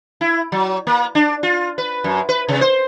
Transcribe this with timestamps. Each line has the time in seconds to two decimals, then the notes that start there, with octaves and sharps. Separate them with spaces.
0.21 E4
0.52 F#3
0.87 A#3
1.15 D4
1.43 F4
1.78 B4
2.04 F#2
2.29 B4
2.49 C3
2.61 C5